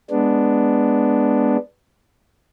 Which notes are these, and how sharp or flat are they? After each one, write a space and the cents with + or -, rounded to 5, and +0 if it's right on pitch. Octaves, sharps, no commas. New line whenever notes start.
G#3 +0 B3 +0 D4 +0